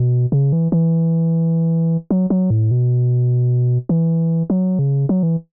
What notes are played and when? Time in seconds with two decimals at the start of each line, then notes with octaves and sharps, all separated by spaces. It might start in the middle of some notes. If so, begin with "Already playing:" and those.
Already playing: B2
0.32 C#3
0.53 E3
0.72 E3
2.11 F#3
2.30 F#3
2.50 A2
2.71 B2
3.89 E3
4.50 F#3
4.79 C#3
5.09 F#3
5.23 E3